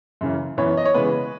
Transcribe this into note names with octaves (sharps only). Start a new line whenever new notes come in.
F#2 C#3 E3
F#2 E3 B3 C#5
D#5
C#5
C#3 E3 G#3 B3 B4